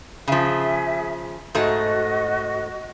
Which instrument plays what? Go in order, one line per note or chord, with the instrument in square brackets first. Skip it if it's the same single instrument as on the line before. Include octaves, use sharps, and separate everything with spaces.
[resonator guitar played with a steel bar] C#3 F3 [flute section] G#4 E5
[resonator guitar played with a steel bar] G#2 A3 [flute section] F#4 D#5